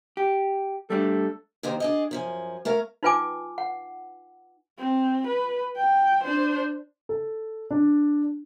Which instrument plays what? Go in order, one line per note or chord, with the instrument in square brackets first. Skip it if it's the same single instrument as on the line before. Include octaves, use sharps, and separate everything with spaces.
[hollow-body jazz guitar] G4
[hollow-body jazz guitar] G3 A3 D4 [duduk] A4
[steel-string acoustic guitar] D#2 D#3 D#4 C5
D4 G#4 D#5
F#2 F3 G#5
A3 A#4 C#5 F5
[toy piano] D#4 F4 B4 G5 G#5 D6
F#5
[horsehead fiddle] C4
B4
G5
D4 C5
[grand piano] A4
D4